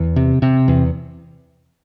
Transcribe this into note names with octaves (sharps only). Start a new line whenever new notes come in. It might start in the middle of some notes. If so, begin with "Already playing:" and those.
Already playing: E2
C3
C3
E2